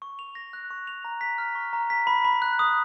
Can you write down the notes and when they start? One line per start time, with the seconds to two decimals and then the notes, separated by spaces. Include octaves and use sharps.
0.02 C#6
0.19 F7
0.35 A#6
0.53 F#6
0.70 C#6
0.87 F7
1.05 A#5
1.21 B6
1.38 F6
1.55 C#6
1.73 A#5
1.90 B6
2.07 B5
2.25 B5
2.42 F#6
2.59 D#6